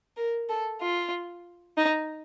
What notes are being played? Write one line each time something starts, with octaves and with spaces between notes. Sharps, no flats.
A#4
A4
F4
D#4